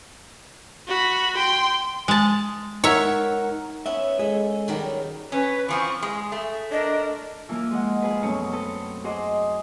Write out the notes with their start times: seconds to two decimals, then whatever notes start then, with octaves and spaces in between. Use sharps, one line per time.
0.88 F#4 B5
1.37 G5 C6
2.08 G#3 A5
2.84 D#4 A#4 C#5 E5 F#5
3.86 B3 C#4 E5
4.19 G#3 G#4 A4 E5
4.68 D#3 F#3 G3
5.32 C#4 B4
5.68 E3 F3 C4 C#6
6.02 G#3 G#4
6.32 A3
6.72 D4 A#4 D#5
7.49 E3 F3 A#3
7.71 G#3 D#5 F#5
8.02 F3 G#4 B4
8.22 F#2 B2 A3 C#4 C#6 D#6
8.52 C4 A4 B4
9.04 F#4 G#4 C5 D#5 D6